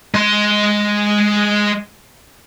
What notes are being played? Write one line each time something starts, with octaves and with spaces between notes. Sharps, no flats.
G#3 C6